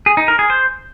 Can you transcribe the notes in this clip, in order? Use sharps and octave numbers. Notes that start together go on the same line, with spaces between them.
G#4
D#4
A#4
G#4
C5